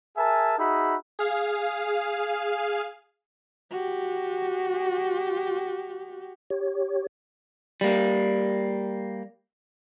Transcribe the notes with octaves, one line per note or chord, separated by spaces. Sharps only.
G#4 A#4 E5 G#5 A5
D#4 F#4 G#4 E5 B5
G#4 F5
F#4 G4
G4 C#5
G3 A#3